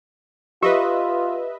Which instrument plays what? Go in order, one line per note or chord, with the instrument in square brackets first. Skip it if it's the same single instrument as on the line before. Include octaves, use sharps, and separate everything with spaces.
[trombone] F4 [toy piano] G4 [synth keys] B4 D#5 E5